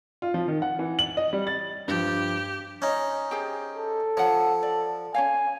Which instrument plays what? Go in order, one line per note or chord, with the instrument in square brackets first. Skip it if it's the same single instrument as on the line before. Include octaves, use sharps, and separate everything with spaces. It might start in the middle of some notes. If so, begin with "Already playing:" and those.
[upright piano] F4
F3
D#3
F#5
E3
F#7
D#5
G3
A6
[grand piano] G2 F3 [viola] G4
[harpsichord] C#4 D#4
[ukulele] G4 G#4 C5
[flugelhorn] A4
[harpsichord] F3 [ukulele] C#5 F#5 A5
[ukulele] D5
[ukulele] C#4 C#5 F5 [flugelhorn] G#5